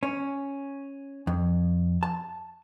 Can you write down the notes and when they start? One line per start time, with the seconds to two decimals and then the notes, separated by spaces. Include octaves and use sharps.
0.03 C#4
1.27 F2
2.03 A5